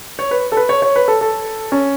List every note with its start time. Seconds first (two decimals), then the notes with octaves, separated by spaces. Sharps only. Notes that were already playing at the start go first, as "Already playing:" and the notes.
0.19 C#5
0.31 B4
0.52 A4
0.57 B4
0.69 C#5
0.82 C#5
0.96 B4
1.08 A4
1.21 A4
1.72 C#4